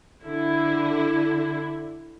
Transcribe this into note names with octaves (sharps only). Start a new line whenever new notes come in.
D3 E4